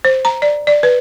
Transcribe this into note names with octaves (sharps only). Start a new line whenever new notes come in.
C5
A#5
D5
D5
B4